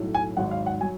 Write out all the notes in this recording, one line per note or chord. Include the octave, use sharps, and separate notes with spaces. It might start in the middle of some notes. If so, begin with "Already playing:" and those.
Already playing: B1 A2 F#3
G#5
G#1 G#2 F#3 F#5
F5
F#5
F#3 G#5